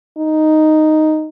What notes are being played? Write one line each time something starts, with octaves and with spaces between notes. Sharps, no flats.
D#4